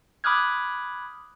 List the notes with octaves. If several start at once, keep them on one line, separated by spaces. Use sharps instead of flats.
B5 D6 D#6 F6 F#6 G#6